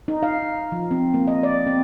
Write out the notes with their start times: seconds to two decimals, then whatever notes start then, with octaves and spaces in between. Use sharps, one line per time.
0.08 D#4
0.23 F5
0.72 F3
0.91 C4
1.14 A#3
1.27 D#5
1.43 D5
1.67 C4